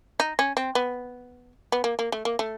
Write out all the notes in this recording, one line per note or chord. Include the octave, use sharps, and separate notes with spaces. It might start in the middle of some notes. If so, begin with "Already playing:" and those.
D#4
C#4
C4
B3
B3
A#3
A#3
A3
A#3
A3